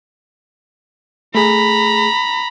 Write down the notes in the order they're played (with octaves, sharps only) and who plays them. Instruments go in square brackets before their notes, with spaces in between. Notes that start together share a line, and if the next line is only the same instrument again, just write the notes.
[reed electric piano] A3 G#4 [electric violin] A#5 B5